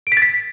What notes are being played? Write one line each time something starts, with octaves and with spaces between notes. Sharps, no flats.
D7
B6
A6
B6